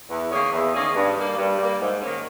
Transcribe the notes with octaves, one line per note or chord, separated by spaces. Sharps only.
E2
D#3 A#3 C#4 G#4
E2
D#3 A#3 C#4 G#4
G2
G3 A#3
G2
G3 A#3
G#2
D#3 A#3 C#4